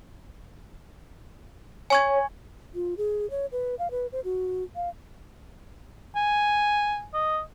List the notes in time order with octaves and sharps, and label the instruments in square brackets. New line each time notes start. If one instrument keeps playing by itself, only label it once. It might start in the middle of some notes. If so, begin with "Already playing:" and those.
[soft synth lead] C#5 [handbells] G#5 C#6 G#6
[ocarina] F4
G#4
C#5
B4
F5
B4
C5
F#4
F5
[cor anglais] G#5
D#5